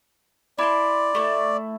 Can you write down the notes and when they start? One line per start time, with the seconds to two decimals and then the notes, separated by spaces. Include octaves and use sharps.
0.58 E4 D5 A5 C6
1.15 A3 E4